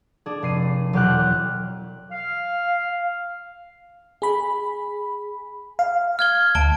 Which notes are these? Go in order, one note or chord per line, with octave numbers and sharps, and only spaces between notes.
D4 G#4
F1 C7 D#7
E1 F#3 G4 F6 F#6
F5
G#4 B5
F5
F6 G#6 G7
D2 A5 D7 G7